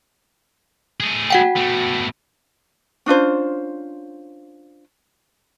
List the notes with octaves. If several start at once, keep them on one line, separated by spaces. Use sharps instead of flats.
A3 G#4
F#4 F#5 G5
B2 A3
C#4 D4 F4 C5